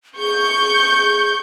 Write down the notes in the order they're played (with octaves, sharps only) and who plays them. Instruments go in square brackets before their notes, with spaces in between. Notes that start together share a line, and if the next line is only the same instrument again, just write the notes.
[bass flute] G#4 [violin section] C#6 G6